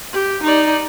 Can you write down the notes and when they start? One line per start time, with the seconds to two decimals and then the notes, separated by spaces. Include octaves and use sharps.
0.13 G4
0.43 D#4 D5